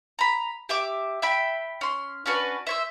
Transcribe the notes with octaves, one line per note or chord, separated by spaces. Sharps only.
A#5 B5
G4 E5 D6
E5 G5 B5
C#4 C6
C#4 D4 F#4 B4
C5 C#5 E5